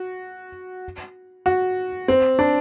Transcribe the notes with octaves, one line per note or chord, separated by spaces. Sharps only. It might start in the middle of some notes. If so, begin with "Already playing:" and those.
Already playing: F#4
F#4
C4
D4